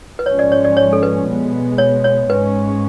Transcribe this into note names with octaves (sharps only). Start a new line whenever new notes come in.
B4
G#2 F3 G#3 C#4 C#5
D5
C#5
D5
C#5
A4
B4
B2 G#3 B3
C#5
C#5
G#2 G#3 C#4 B4